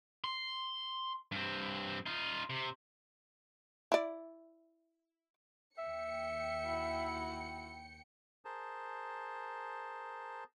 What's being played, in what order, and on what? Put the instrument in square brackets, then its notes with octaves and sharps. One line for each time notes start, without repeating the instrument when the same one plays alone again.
[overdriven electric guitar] C6
G2 C4
D#4 F4
C3
[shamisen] E4 D5
[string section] D#2 G5 C#7 [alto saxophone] E5
[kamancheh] E4 F#4
[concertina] G#4 A#4 C5 A5